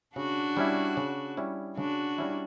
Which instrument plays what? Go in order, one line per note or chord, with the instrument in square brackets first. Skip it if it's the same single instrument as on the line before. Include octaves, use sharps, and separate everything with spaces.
[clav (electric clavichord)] C#3 [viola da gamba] D4 F#4
[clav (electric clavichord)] G3 C#4 E4
C#3
G3 C#4 E4
[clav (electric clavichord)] C#3 [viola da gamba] D4 F#4
[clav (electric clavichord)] G3 C#4 E4